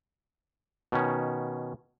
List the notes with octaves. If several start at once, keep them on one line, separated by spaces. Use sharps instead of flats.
B2 D#3 C#4